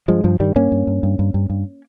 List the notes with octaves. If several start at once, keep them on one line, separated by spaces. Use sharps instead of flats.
G2 F3 G#3
G2 F3
G2 D#3 G3
G2 A#3 C#4
G2
G2
G2
G2
G2
G2